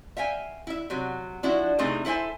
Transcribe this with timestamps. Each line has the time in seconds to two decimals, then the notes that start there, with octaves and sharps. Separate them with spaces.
0.17 E5 F5 G5 G#5
0.67 E4 E5
0.90 C3 F#3
1.43 F3 D4 E4 F#4
1.78 C3 E3 A3 C4 D#4 G#4
2.05 E4 A4 C5 E5 G#5